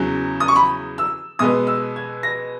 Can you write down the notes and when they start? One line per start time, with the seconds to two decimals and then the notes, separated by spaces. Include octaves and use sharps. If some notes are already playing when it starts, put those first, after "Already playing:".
Already playing: E2 C#3 F#3
0.40 D#6
0.48 C#6
0.56 B5
0.98 E6
1.39 B2 G#3 B3 D#6
1.67 E6
1.96 G#6
2.23 A#6